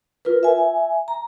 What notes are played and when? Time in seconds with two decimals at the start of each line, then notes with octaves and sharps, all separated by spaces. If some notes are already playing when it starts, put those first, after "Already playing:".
0.25 F4 A#4 B4
0.43 E5 G#5
1.08 A#5